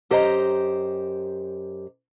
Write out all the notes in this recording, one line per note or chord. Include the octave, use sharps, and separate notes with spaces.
F#2 G4 C5 D#5 A#5